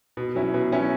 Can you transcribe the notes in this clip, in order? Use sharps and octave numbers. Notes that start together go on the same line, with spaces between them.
B2
F#3 C#4 E4
B2
F#3 C#4 E4